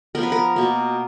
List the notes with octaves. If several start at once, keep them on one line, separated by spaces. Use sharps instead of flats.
F3 B3 A#4
B4
A#4
B2 A#3